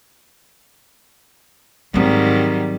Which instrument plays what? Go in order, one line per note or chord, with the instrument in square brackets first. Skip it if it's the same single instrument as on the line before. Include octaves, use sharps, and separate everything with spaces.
[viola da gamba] G#2 D#3 G3 [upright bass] F#3 C4